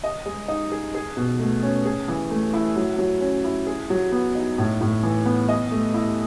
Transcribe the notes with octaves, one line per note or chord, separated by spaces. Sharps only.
D#5
G#3
D#4
G#4
G#4
B2
A3
C#4
G#4
E3
A3
E4
F#3
F#3
C#4
E4
G#4
F#3
B3
D#4
A2
A2
E3
B3
D#5
A3
E4